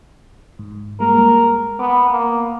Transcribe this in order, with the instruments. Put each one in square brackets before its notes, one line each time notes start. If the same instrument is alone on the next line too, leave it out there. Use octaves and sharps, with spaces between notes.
[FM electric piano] G#2
[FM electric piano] G3 G#3 A#3 [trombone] A#4
[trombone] B3 [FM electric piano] D6
[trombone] A#3